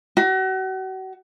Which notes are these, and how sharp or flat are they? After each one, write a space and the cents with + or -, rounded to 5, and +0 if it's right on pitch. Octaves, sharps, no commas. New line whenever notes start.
F#4 +35